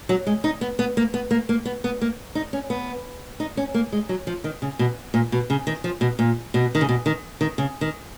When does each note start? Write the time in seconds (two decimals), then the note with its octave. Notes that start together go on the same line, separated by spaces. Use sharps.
0.09 F#3
0.27 G#3
0.44 D#4
0.61 B3
0.79 B3
0.97 A#3
1.14 B3
1.31 A#3
1.49 A#3
1.65 B3
1.84 B3
2.01 A#3
2.35 D#4
2.53 C#4
2.70 B3
3.40 D#4
3.57 C#4
3.74 A#3
3.92 G#3
4.09 F#3
4.27 F3
4.44 D#3
4.62 C#3
4.79 B2
5.14 A#2
5.32 B2
5.50 C#3
5.67 D#3
5.84 F3
6.01 B2
6.19 A#2
6.54 B2
6.75 D#3
6.81 C#3
6.89 B2
7.06 D#3
7.41 D#3
7.58 C#3
7.81 D#3